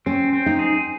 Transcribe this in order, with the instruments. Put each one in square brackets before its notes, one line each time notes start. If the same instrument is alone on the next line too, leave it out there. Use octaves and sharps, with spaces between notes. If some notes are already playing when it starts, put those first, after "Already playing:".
[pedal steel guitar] C4 [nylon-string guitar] C#4
[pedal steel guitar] C4
[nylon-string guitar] D#4
[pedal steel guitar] G#4